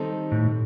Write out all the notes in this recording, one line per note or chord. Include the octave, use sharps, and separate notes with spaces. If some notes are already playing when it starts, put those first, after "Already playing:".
Already playing: D#3 G3 C4 D#4 A4
A2